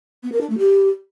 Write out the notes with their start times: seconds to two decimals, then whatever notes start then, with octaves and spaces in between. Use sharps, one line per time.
0.23 B3
0.32 A#4
0.41 D4
0.50 A3
0.58 G4